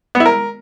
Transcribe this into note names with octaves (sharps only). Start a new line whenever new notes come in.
B3
E4
A#4